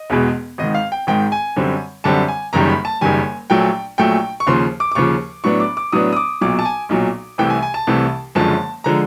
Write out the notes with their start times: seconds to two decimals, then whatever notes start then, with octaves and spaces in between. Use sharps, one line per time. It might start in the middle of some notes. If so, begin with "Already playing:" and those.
Already playing: D#5
0.10 E1 E2 B2 G#3
0.58 G#1 G#2 D#3 D#5
0.74 F5
0.92 G5
1.07 G#1 G#2 D#3 G5
1.32 G#5
1.56 F#2 D3 G3 C4
2.04 F#2 D3 G3 C4 A5
2.28 G#5
2.53 F#1 F#2 D#3 G3 A#5
2.69 B5
2.85 A5
3.01 F#1 F#2 D#3 G3 G#5
3.50 A#1 A#2 F#3 A3 G5
3.98 A#1 A#2 F#3 A3 G5
4.40 C#6
4.47 D#2 C#3 F3 C6
4.80 D6
4.91 D6
4.95 D#2 C#3 F3 C#6
5.44 A2 F#3 B3 D4 C#6
5.60 D6
5.77 D6
5.92 A2 F#3 B3 D4 D#6
6.12 D#6
6.16 D6
6.41 B1 A#2 F#3 D6
6.59 A5
6.65 G#5
6.89 B1 A#2 F#3
7.38 C2 C3 E3 A3 G5
7.50 G#5
7.62 G#5
7.74 A5
7.87 C2 C3 E3 A3
8.35 F#1 F#2 D3 F3 G#3 A5
8.84 D3 F3 G#3 A#5